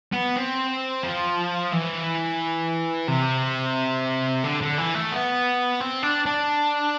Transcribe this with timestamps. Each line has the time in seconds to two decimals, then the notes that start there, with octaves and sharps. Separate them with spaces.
0.13 B3
0.36 C4
1.03 F3
1.72 E3
3.08 C3
4.44 D3
4.61 D3
4.78 E3
4.95 A3
5.12 B3
5.80 C4
6.03 D4
6.26 D4